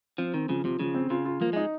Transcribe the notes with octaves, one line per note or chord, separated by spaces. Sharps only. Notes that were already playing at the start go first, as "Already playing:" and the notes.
F3 C4
D#3 C4
C#3 F3
C3 F3
C#3 F3
C4
C#3 F4
F4
F3 A#3
G#3 D#4